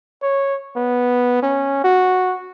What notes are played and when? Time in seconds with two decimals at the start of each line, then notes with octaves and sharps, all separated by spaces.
0.22 C#5
0.76 B3
1.43 C#4
1.84 F#4